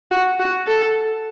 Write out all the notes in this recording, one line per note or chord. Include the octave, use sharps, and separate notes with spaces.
F#4
F#4
A4